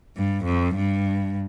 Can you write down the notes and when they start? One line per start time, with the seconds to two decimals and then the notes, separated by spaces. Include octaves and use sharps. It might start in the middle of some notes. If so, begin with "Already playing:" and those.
0.16 G2
0.45 F2
0.75 G2